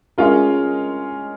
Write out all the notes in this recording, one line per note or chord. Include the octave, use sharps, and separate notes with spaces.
G#3 C#4 F4 A#4